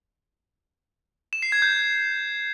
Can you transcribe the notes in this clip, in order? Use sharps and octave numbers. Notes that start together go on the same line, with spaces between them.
E7
C7
G#6
G6